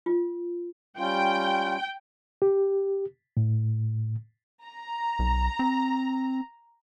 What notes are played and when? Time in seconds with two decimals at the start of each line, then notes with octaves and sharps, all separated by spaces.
0.06 F4
0.98 G3 C#4 F4 G5
2.42 G4
3.37 A2
4.65 A#5
5.19 B1
5.59 C4